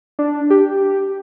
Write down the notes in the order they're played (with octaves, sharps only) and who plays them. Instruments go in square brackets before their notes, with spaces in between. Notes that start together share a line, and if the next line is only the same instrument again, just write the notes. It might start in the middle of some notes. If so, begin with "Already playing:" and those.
[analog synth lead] D4
G4